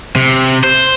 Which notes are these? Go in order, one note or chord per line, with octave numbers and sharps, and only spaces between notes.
C3
C5